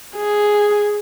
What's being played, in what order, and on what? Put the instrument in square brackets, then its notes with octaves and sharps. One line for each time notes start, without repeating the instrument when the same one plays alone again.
[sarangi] G#4